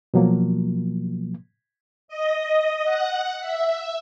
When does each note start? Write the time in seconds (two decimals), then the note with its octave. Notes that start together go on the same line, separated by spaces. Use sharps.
0.14 B2 F3 F#3 A#3
2.08 D#5
2.84 F#5
3.40 E5